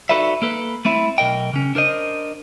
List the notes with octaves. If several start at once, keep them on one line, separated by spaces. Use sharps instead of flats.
D#4 F#4 A4 B4 D5 E5
A#3 A4 B4
A3 C4 E4
B1 A#4 D#5 G5
C#3 C#4
D4 A#4 C5 D#5